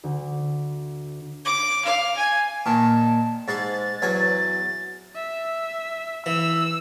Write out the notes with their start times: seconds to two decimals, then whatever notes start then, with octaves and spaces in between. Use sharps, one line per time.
0.04 D2
1.45 D6
1.85 F5
2.17 G#5
2.66 A#2 D#3 A5
3.48 G#2 G#3 C6 A6
4.02 E2 F#3 G#5
5.16 E5
6.26 E3 E6